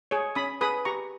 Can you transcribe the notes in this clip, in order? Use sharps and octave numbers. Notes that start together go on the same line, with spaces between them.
G#4 C#5
C#4 B5 D#6
G#4 B4 B5 D#6
G4 A#5 C#6